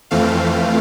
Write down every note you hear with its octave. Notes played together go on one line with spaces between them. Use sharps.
F2 E3 A3 C4 F5